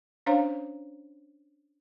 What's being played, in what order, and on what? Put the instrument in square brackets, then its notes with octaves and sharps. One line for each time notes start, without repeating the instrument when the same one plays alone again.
[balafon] C#4 D4 C5 C#5 F5 A#5